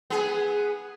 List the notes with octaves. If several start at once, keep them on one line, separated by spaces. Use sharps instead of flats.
B3 G#4